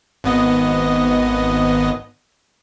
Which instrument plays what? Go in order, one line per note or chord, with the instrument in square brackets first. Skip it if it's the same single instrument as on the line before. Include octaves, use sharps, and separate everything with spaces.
[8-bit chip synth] G#1 B3 D#5